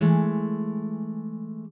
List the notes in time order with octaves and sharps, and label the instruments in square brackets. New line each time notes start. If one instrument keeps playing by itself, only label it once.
[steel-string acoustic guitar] E3 G#3 A3